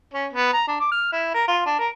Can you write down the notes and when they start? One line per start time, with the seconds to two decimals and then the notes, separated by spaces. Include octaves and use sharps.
0.14 C#4
0.33 B3
0.53 A#5
0.67 D4
0.80 D6
0.92 F6
1.12 E4
1.34 A#4
1.48 F4
1.66 D4
1.79 A#4